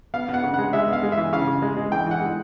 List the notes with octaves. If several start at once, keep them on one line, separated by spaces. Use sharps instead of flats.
B3 F5
B3
F#5
C#3
G#3 F#5
G#3 E5
B3 F5
G#3
E5
E3
C#3 F5
C#3
G#3
G#3
E3 G5
E3 F#5
G#3